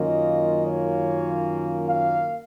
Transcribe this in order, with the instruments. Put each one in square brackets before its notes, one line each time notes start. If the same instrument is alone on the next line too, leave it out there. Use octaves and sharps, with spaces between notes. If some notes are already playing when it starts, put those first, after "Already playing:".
Already playing: [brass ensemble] F#2 D#3 A#3 C#4 F4 D#5
C#5
F5